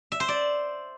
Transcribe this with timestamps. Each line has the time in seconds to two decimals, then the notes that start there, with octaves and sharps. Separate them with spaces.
0.12 E5
0.20 C5
0.28 D5